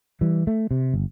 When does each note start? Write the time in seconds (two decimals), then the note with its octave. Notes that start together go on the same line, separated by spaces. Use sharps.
0.21 E3 G3
0.47 A3
0.71 C3
0.94 G1